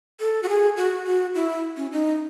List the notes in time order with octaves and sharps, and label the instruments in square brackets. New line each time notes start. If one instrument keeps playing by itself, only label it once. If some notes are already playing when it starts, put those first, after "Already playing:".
[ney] A4
F#4
G#4
F#4
F#4
E4
C#4
D#4